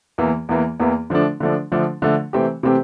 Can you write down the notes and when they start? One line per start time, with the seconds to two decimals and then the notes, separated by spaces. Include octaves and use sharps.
0.18 E2 E3 A#3
0.49 E2 E3 A#3
0.80 E2 E3 A#3
1.10 D3 F3 A3 D4
1.40 D3 F3 A3 D4
1.72 D3 F3 A3 D4
2.02 D3 F3 A3 D4
2.33 C3 E3 A3 C4 G4
2.63 C3 E3 A3 C4 G4